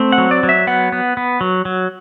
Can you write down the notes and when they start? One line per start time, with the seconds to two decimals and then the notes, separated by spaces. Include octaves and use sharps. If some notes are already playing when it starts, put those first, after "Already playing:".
Already playing: A3 C4
0.12 F#5
0.18 F#3
0.31 D5
0.43 F#3
0.49 E5
0.67 B3 F#5
0.92 B3
1.17 B3
1.41 F#3
1.65 F#3